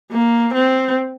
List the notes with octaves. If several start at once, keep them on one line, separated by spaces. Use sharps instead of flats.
A#3
C4